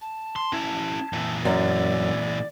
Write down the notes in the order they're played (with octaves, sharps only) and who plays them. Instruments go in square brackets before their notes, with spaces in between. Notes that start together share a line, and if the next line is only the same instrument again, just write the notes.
[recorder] A5
[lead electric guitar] C6
C#4 E4
A#2 E3
[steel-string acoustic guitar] F#2 [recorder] D5